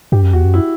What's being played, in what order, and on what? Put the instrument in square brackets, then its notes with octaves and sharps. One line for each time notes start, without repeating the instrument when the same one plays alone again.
[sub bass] G2 [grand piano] G4
[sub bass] F#2
[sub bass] E2 [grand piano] F#4
[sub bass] F#2
[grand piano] E4